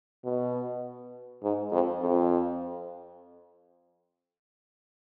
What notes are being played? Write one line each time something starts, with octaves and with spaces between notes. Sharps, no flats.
B2
G#2
F2
F2